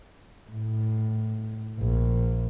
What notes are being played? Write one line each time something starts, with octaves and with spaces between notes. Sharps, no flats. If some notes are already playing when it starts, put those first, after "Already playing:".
A2
A#1